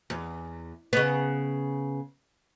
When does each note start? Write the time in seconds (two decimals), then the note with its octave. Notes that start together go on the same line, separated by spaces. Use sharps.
0.10 E2
0.93 C#3 B3